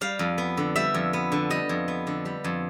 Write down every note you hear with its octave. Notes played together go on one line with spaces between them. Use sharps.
G3 F5
F2
B3
D3
G3 E5
F2
B3
D3
G3 D#5
F2
B3
D3
G3
F2